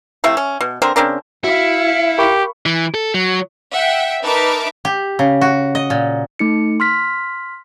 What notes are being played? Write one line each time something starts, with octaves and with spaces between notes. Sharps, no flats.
C3 A3 E4 F5
C#4
B2
D3 C4 A#4
C#3 C4 D4 A#4
E4 F#4 F5 C#7
G4 A#4 B5 C#6
E3
A4
F#3
E5 F#5 G5
D#4 A#4 B4 E5 A5 D6
G4
C#3
F#4
D#5
A#2
A3 D#4 C#7
C6 F6 B6